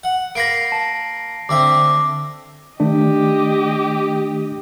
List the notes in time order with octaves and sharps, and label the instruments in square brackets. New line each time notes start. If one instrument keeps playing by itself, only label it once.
[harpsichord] F#5
[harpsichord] A#3 A#5 B5 [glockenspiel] A#6 C7 D7
[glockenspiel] A5
[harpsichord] D2 C4 E5 [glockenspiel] D6
[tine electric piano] D#3 A3 D4 [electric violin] G4 D#5